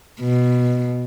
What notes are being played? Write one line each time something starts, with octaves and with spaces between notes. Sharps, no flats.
B2